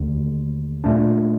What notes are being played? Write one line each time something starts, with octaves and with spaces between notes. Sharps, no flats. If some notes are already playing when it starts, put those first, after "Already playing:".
Already playing: D#2 D3 A3
A#2 A3 D4